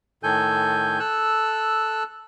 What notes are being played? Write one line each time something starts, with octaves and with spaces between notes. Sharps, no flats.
A2 D#3 A4 G#5 G6
A4 E6 F#6